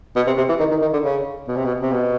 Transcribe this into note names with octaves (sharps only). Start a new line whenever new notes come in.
B2
C3
C3
E3
D#3
D#3
D#3
D3
C#3
B2
C3
B2
C3
B2